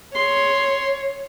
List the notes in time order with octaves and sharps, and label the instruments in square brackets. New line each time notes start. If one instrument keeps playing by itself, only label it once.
[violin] C#5 [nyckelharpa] C6